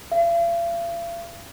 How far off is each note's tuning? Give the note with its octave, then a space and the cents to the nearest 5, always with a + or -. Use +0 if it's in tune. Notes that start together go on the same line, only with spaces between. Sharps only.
F5 -45